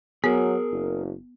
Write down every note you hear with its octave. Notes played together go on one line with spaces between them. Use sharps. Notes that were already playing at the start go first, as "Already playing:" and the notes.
F#3 B3 G#4 A#4
F#1